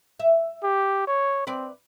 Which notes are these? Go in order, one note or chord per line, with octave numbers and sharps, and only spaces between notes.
E5
G4
C#5
C4 B4 D5